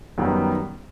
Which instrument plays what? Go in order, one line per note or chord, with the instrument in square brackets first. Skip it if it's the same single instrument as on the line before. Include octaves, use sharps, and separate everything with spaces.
[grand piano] F#2 D#3 G3 B3